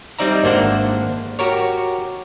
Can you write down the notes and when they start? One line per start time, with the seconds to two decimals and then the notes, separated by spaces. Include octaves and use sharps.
0.19 G3 C4 D#4 D5 E5 A#5
0.44 G#1 A#3 D4 C5 E5 F#5
1.39 F#4 G4 A#4 C#5